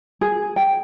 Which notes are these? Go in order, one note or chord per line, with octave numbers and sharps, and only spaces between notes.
G#4
G5